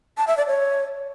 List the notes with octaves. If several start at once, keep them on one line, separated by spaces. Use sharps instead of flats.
A5
E5
D5
C#5